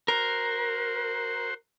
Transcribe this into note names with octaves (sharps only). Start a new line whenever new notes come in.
F#4 A#4 C5